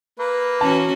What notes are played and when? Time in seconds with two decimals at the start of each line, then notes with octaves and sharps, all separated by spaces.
0.19 A#3 B4
0.61 E3 C#4 F#4 A5